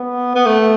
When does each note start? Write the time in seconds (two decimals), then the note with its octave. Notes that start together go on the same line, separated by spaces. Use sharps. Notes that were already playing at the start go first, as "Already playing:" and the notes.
Already playing: B3
0.36 B3
0.46 A3